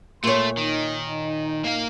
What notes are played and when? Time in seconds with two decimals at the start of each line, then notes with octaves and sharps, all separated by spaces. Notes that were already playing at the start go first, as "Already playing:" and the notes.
0.24 A#2 A3 C#5 C6
0.57 D#3 D#4
1.64 A#3 F5